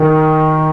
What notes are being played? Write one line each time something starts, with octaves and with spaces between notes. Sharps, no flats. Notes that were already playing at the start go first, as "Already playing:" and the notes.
Already playing: D#3